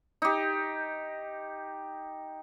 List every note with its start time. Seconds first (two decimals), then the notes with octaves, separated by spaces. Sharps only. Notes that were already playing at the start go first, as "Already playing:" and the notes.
0.22 D#4 G4